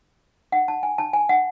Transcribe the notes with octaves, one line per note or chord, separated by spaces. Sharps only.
F#5
A5
G#5
A5
G#5
F#5